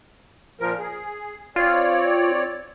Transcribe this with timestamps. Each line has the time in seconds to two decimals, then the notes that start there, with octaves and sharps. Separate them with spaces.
0.60 A#2 F3 A#4
0.78 G#4
1.56 C4 F4 C#5 D5